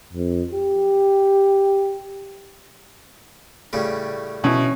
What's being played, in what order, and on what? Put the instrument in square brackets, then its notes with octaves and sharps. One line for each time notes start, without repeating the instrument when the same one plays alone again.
[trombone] F2
G4
[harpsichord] A2 C#3 G3
[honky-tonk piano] B2 E4 [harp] C#4